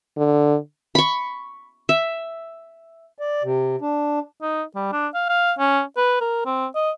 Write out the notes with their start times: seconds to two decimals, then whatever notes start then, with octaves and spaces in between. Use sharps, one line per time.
0.17 D3
0.95 B5 C#6
1.89 E5
3.18 D5
3.44 C3
3.81 D4
4.42 D#4
4.75 G3
4.93 D4
5.14 F5
5.29 F5
5.59 C#4
5.97 B4
6.21 A#4
6.46 C4
6.75 D#5